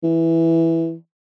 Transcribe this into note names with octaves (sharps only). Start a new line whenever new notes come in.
E3